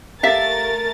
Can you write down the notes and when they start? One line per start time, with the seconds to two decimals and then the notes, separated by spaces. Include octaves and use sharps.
0.23 A3 G4 A#4 E5 F5 A6